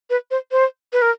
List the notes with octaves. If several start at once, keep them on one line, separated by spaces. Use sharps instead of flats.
B4
C5
C5
B4
A#4